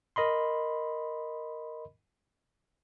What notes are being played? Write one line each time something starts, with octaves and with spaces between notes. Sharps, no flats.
A#4 D#5 B5 C6